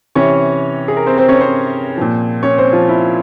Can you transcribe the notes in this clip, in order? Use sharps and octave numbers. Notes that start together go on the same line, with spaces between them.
C3 E3 C#4 C#5
G#4
A#4
C4 C5
C4 C5
C#4 C#5
C4 C5
A#2 F3
C#4 C#5
C4 C5
F3 F4
E4